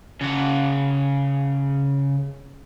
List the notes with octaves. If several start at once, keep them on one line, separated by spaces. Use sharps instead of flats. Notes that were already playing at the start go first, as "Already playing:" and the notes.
C#3 F#5